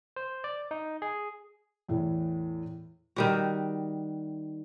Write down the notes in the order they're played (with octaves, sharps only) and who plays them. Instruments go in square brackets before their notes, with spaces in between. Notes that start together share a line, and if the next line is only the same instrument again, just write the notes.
[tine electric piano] C5
D5
D#4
G#4
[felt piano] E2 A2 E3
[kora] D#3 G3 F#4